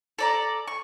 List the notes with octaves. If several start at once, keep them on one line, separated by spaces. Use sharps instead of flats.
A4 D5 A#5
C#6